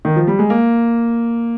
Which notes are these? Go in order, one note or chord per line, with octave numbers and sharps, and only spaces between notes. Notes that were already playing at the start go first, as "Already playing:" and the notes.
D#3
F3
G3
G#3
A#3